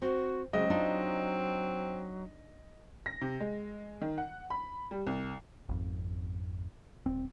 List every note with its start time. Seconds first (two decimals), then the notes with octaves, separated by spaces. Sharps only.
0.02 C4 F#4
0.53 C#3 F#3 G#3 C4 D#5
0.70 D4 D#4 F4
3.06 A#6
3.21 C3
3.40 G#3
4.01 D#3
4.18 F#5
4.50 B5
4.91 G3
5.07 C2
5.69 G#1 F2
7.06 D#1 C4